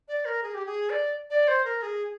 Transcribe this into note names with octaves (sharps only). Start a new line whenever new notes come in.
D5
A#4
G#4
G4
G#4
D5
D5
C5
A#4
G#4